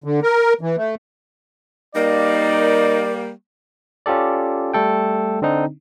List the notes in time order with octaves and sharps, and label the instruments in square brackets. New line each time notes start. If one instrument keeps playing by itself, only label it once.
[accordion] D3
A#4
E3
A3
[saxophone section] G3 A#3 [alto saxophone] D#4 [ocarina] A#4 [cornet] D5
[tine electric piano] C#4 F4 G4 A4 D5
G3 A3 A4 G5
D3 C4 D4 D#4